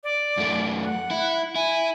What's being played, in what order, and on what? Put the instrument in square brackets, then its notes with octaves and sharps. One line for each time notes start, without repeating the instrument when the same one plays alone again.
[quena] D5
[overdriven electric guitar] F#2 A3
[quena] F#5
[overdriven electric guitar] E4
[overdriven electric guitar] E4 [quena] G#5